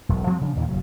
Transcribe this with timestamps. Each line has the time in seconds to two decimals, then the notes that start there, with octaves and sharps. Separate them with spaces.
0.09 E1 B1
0.27 F3 G3 C4
0.41 C#3 F3 D4
0.56 D#2 A#2 D#3 E3
0.69 F#1 C#3 F#3